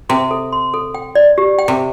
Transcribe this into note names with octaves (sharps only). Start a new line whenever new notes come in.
C3 C6
A4
C6
A4
G5
D5
G4
G5
C3